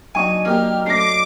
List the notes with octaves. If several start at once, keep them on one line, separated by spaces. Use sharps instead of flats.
F#3 D4 D#4 G#5 C#6 D#7
A#3 G4 F6
A3 C#4 D6 A#6 C7